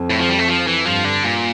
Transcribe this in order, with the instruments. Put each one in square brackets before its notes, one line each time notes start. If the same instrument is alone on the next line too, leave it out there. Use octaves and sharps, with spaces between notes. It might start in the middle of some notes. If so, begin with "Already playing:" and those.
Already playing: [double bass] F2
[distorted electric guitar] A2
F3
G3
A3
F3
E3
[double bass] G2 [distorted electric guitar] F3
[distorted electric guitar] D3
A#2